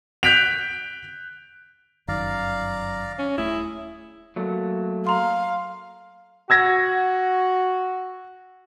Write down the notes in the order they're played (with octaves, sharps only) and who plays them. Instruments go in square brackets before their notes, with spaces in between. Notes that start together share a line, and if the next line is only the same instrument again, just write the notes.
[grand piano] F#6 G6 B6 D7 F7
[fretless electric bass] G1 F#2 D#3 [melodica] D5 F5 A#5
[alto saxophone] C#4
[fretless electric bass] D#1 A3 [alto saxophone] E4 [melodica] G#4
[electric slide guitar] F#3 A3 A#3
[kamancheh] F5 [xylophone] A#5 C6
[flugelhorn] F#4 [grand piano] E6 G#6 A#6